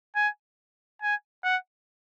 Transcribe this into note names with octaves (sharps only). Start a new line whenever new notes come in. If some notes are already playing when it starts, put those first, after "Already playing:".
G#5
G#5
F#5